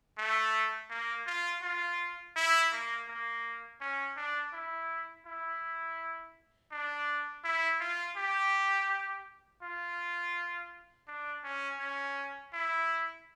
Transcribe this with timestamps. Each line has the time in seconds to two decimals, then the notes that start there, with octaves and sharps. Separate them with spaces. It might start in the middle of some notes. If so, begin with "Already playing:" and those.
0.18 A3
0.90 A#3
1.27 F4
1.62 F4
2.36 E4
2.72 A#3
3.08 A#3
3.81 C#4
4.17 D4
4.53 E4
5.26 E4
6.72 D4
7.44 E4
7.80 F4
8.17 G4
9.63 F4
11.08 D4
11.44 C#4
11.80 C#4
12.53 E4